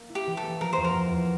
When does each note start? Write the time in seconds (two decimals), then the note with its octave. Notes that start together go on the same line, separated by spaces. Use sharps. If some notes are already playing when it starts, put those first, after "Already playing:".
Already playing: A#3
0.10 E4
0.15 G4
0.27 E3
0.37 A4
0.44 A#3
0.60 F3 A#4
0.73 E2 C5
0.84 A#4
0.95 E2
1.12 E2